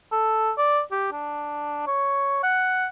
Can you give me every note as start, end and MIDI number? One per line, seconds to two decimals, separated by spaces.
0.12 0.51 69
0.58 0.82 74
0.92 1.10 67
1.12 1.82 62
1.87 2.40 73
2.43 2.87 78